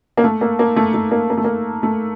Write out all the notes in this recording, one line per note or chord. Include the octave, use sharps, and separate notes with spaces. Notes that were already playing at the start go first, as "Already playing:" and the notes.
A#3
A3
A#3
A#3
A3
A3
A#3
A#3
A3
A#3
A3